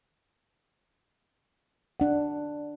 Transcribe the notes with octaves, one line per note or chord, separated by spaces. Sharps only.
D4 F#5